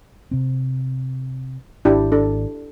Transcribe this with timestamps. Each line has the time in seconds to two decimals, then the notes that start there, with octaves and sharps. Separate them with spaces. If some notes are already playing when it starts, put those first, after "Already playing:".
0.31 C3 C4
1.85 G#1 D4 E4 G4
2.12 D4 A4